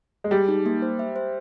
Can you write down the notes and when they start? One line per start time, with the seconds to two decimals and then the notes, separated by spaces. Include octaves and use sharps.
0.24 G#3
0.31 G3 G#4
0.48 D#4
0.66 A#3
0.82 C5
0.99 E5
1.16 C5